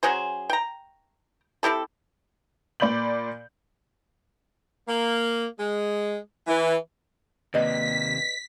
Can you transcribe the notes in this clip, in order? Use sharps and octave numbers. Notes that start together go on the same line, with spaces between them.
F#3 C#4 G#4 C5
G5 A#5
C4 E4 G4 A4
A#2 D5 B5 G6 F#7
A#3
G#3
E3
D#2 C3 A#3 B4 D5 D#5 B6